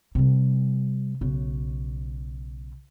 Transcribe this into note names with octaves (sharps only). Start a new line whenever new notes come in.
C3 G3
B1 C#3